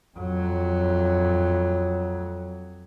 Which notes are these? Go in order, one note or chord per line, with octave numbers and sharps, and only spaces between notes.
F2 F#3